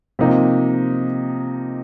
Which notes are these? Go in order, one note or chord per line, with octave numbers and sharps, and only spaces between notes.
C3 F3 A#3 D#4